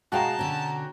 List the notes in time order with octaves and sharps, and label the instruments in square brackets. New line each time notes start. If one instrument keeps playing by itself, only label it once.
[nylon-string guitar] B2 G#3 F5 [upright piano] F#4 G5 A#5 [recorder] A5
[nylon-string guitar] B2 D3 C#4